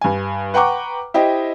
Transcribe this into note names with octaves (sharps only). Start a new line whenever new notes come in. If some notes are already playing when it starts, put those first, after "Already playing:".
G2 G#5
B4 F#5 G5 A#5 C#6 D6
E4 G4 C5 D#5 G5